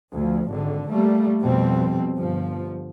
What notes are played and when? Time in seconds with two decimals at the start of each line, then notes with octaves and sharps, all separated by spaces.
0.14 D2 F3
0.51 G#1 D3
0.90 G3 A3 A#3
1.43 F2 B2 G3 C4
2.17 G1 F3